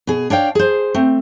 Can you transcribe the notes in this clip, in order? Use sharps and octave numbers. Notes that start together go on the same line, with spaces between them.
B2 G#4
D4 C#5 F5 G5
G#4 C5
A3 C4